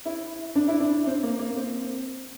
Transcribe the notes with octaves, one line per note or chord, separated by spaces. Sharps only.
E4
D4
E4
D4
C4
A#3
A#3
C4